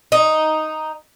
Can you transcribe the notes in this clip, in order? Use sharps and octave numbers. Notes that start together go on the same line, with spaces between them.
D#4